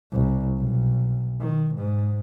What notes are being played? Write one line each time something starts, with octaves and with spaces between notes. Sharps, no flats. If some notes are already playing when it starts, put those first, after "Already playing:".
C2
B1
D#3
G#2